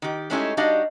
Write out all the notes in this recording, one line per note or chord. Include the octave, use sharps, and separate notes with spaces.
D#3 G4
G#3 A3 C#4 D#4 E4 G4
G3 D4 D#4 F#4 D#5 F5